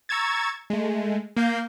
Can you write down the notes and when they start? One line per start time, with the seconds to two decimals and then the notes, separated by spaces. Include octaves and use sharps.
0.09 A#5 C#6 E6 G#6 A6
0.70 G#3 A3
1.37 A#3 F5 G6